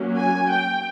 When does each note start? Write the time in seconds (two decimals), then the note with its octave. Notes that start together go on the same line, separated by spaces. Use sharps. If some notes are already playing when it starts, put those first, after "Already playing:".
Already playing: F#3 A#3 C#4
0.16 G#5
0.49 G5